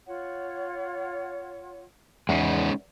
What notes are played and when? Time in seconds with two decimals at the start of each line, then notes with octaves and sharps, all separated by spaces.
0.05 F4 C#5 F#5
2.29 E2 G#3 C#4 D#4